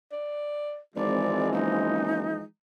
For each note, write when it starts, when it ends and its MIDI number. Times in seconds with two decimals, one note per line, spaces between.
0.12 0.78 74
0.96 1.48 32
0.96 2.44 52
0.96 2.44 53
0.96 2.44 56
0.96 2.13 60
0.96 1.50 74
1.52 2.31 30
1.52 2.40 63